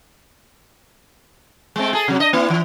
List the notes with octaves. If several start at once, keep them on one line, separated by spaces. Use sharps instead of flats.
G#3 A3 C4
G#4 A4
C3 F#3
D4 D#5
A#3 E4
E3